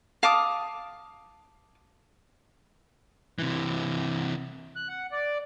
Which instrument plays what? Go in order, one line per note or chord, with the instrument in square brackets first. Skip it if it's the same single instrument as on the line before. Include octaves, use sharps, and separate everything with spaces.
[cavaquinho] F5 A5 D6 D#6
[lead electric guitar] C3 E3
[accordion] F#6
F#5
D5